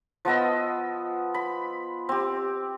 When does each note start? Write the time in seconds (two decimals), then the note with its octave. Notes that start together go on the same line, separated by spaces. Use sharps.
0.25 F3 B3 D#5 E6
1.34 B5
2.09 C4 G4